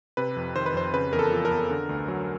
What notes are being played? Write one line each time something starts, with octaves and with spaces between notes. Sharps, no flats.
C3 B4
F2
D#3 C5
B4
F2 C5
C#3 B4
E2 A#4
A4
F3
A#4
E2
D3
D2
F#3